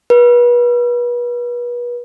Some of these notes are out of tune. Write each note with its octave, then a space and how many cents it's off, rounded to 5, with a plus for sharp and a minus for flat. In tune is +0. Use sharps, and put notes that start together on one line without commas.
B4 -35